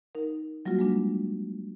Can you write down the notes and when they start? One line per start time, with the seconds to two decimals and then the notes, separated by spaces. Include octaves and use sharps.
0.15 D#4 A#4
0.66 F#3 G3 A#3 F4 F#4
0.79 G#3 A#3 D4